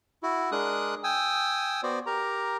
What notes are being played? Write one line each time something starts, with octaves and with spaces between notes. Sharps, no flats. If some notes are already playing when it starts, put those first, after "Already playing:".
E4 F#4
G#3 D4 G#4 A#4 D#6 F#6
G5 G#5 D#6 E6
B3 F#4 C5 D5
G4 A#4 A#5